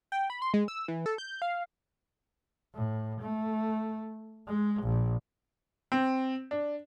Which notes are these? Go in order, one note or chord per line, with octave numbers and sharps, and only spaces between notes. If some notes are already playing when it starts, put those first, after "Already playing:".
G5
B5
C6
G#3
E6
E3
A4
G6
F5
A2
A3
G#3
A#1
C4
D4